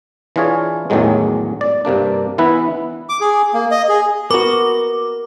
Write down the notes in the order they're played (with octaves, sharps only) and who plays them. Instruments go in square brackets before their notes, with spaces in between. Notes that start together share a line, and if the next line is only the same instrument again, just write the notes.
[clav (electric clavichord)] E3 D4 F4 G#4 C#5
A1 E2 A2 D#3 F#3 G#3
D5
G2 C3 A#3 D4
E3 B3 E4 B4
[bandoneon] D6
G#4
A#3
D#5
G#4
[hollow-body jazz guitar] B3 F#4 [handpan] A#4 [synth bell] D6